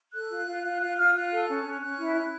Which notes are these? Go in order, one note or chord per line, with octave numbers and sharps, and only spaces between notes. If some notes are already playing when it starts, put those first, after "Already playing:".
A4 F#6
F4
F4
F4
F4 F#6
F4 F6
F4 F#6
A4
C#4
C#4
C#4 F#6
E4
E4